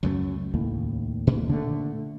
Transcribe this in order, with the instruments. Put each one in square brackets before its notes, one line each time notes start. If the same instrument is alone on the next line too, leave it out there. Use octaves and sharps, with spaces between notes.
[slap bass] C#2 F#3 A3 [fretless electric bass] F#2
[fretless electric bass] D#2 A2
[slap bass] A#2
[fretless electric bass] D3 A3